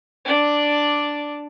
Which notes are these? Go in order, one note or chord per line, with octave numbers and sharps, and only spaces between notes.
D4 D5